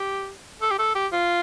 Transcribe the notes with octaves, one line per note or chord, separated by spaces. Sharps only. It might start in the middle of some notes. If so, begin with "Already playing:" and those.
Already playing: G4
A4
G4
A4
G4
F4